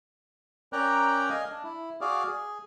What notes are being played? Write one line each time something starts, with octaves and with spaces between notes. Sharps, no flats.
C#4 A#4 D5 G5 A#5 F#6
D#5 F5 G#5
D4
E4
F#4 G#4 D5 F5
G#4